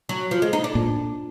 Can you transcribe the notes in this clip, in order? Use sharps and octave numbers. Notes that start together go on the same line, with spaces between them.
F#3
F3
G#3
D#4
D4
A#2